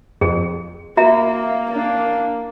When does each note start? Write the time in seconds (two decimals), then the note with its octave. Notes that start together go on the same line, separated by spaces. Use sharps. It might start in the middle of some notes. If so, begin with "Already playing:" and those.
0.21 F2 G#4
0.97 A#3 F#4 E5 A#5
1.70 A#3 D4